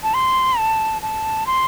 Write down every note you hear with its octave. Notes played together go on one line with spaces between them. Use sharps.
A5
C6
A5
A5
C6